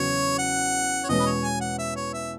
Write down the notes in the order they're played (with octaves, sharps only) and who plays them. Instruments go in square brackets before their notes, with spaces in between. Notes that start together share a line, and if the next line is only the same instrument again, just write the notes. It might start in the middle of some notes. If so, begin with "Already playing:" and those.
Already playing: [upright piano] E2 C#3 F#3 C#4 F#4 [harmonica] C#5
[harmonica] F#5
C#5
[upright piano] E2 B2 G#3 C#4 [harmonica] D#5
[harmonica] B4
C#5
G#5
F#5
E5
C#5
E5